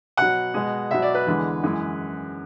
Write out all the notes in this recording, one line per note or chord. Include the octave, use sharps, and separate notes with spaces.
B2 F#3 F#5
B2 G#3
B2 F#3 E5
D5
B4
E2 D3 G#3
F#2 E3 G#3